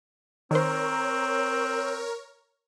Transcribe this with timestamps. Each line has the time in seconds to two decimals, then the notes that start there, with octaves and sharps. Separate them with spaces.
0.51 D#3 C4 A#4 C5 C#5